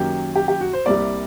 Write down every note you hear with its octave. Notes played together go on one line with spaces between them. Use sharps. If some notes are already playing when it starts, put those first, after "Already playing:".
Already playing: F#2 D#3 F#3 A#3 G4
G4
G4
F#4
C5
C2 C3 G3 A#3 D5